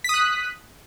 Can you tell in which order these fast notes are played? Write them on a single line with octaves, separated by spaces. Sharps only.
B6 D#6 F#6